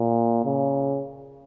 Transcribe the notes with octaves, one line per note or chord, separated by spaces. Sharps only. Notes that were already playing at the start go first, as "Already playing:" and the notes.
Already playing: A#2
C#3